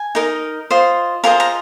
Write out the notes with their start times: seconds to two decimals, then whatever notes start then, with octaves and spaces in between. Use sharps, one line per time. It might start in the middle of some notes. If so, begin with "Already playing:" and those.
Already playing: G#5
0.15 D#4 A#4 D#5
0.71 F4 C5 D#5
1.24 F4 G#4 A#4 C5 D#5 A#5
1.40 A#5